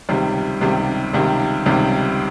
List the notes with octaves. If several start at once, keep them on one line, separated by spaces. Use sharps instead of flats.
C#2 C3 D#3 G3
C#2 C3 D#3 G3
C#2 C3 D#3 G3
C#2 C3 D#3 G3